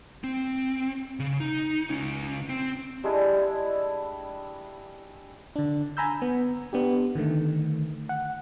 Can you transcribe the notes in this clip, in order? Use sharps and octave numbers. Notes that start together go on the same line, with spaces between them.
C4
C#3
D#4
C#2 C#4
C4
G3 G#3 D4 E4
D3 D4
G#5 A#5 B5 E6 G6
B3
B3 D4 G4
D3 D#3 A3
F#5